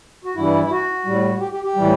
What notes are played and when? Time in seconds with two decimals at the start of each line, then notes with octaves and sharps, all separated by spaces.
0.24 F#4
0.35 G2 E3 G3 E4
0.65 E4
0.71 F#4
1.05 A2 G3
1.40 G4
1.51 G4
1.63 G4
1.76 A2 E3 G3